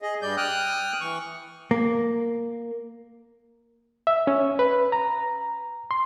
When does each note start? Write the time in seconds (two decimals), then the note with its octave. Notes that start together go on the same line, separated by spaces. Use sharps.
0.02 G#4 D#5
0.22 G2 G3 D5 G6
0.37 G5 D#6 F6 F#6
1.01 E3 C#6
1.71 A#3
4.07 E5
4.27 C#4
4.59 B4
4.92 A#5
5.91 C6